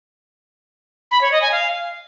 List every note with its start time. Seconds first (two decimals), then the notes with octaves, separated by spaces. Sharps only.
1.11 B5
1.21 C#5
1.32 D#5
1.42 G#5
1.52 F5